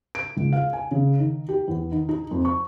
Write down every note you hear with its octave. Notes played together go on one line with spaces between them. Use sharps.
D7
C#2
F5
G#5
C#3
D#3
G4
E2
D#3
D#4
F2
C#6